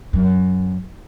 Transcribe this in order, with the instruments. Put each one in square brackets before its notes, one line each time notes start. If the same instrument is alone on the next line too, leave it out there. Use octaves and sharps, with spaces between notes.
[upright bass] F#2